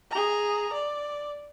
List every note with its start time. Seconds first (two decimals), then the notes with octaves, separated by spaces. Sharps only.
0.11 G#4 A#5
0.73 D5